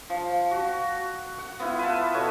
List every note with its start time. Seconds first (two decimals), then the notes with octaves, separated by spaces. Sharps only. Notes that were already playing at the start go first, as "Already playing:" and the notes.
0.10 F3
0.51 F#4
1.38 F#5
1.60 B3 E4 F4
1.79 B4 A5
2.14 B2 A4 C#5